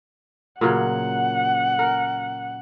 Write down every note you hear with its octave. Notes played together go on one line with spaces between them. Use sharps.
A#2 C#3 F#3 F#5
A#4